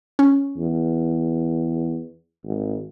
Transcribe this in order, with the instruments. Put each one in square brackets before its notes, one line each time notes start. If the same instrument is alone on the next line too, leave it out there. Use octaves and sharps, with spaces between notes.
[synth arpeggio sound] C#4
[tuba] E2
G#1